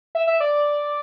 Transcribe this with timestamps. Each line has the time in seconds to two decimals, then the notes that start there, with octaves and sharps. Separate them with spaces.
0.15 E5
0.27 E5
0.40 D5